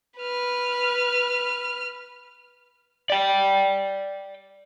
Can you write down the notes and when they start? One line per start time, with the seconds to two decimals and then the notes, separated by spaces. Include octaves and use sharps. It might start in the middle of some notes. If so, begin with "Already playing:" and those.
0.19 B4 F6
3.10 D5 G5